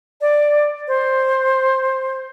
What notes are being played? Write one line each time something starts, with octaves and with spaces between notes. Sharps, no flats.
D5
C5